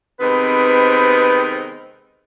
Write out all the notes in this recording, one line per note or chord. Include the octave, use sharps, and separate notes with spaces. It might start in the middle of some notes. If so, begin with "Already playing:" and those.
C3 D#3 G#3 B3 C4 B4